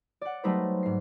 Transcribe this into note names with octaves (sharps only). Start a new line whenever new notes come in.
D5 F#5
F#3 G3 A3 D#4 B4 C5
G#2 C7